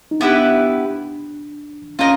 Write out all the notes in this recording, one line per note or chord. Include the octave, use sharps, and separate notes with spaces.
D#4
B3 D4 E4 G4 B4
C#4 F4 A#4 D#5